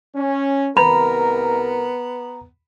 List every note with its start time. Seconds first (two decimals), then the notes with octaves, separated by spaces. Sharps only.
0.16 C#4
0.77 C2 B3 A#4 A#5 B5